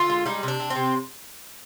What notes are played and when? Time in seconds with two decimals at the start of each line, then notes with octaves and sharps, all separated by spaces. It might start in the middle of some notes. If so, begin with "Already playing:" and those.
Already playing: D3 F4
0.10 G#3
0.26 G3 D#4
0.43 C3 D4
0.60 C3
0.70 C4
0.75 C3